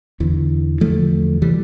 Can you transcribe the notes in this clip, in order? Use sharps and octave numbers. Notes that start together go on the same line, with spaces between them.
E2 D3 E3
E2 D3 F3 A3
C3 E3 G3